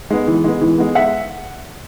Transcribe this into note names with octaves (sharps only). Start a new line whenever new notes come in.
G#3 B3
E3
G#3 B3
E3
G#3 B3
E5 F#5